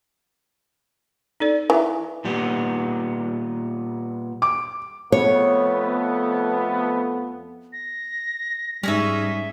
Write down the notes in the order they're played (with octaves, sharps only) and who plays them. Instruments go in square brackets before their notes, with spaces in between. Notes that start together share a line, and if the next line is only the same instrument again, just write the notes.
[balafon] D#4 A4 D5
[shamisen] E3 [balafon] E5 A#5
[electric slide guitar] A#2 G3 B3
[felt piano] D6
[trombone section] F2 A3 B3 [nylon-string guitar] C#5
[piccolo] A#6
[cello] G#2 D#4 [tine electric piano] G3 [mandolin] C#4 G#4 E5